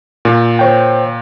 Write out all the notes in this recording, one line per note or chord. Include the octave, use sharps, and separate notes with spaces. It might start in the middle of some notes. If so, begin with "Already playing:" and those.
A#2
C5 C#5 G5